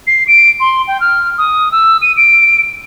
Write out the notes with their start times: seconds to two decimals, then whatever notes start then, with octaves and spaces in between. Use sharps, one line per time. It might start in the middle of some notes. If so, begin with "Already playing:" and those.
0.07 C7
0.28 D7
0.60 C6
0.87 G5
1.00 F6
1.38 D#6
1.72 E6
2.02 D#7
2.17 D7